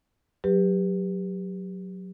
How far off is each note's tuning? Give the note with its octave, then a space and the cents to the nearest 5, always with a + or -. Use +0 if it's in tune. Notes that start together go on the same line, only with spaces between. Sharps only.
F#3 +0 G4 +20 B4 +0